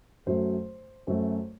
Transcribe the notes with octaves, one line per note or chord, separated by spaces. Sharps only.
F#2 F#3 A3 C5
F#2 F#3 A3 C5